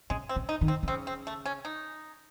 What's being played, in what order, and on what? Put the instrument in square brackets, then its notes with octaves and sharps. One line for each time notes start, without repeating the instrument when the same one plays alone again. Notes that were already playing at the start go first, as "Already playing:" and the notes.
[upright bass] C#3 [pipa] G#3
[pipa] C4
[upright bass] C#3
[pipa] D#4
[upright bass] D#3
[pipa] C4
[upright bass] D#3
[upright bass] C#3 [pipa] C4
[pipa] C4
A3
C#4
D#4